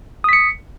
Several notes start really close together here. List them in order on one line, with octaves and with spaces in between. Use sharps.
D#6 B6 C#7